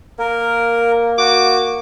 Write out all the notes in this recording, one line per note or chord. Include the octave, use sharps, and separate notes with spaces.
A#3 A#4
F#4 D6